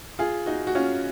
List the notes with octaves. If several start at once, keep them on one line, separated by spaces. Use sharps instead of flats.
F4 G#4
D#4 F#4
F#4
C#4 F4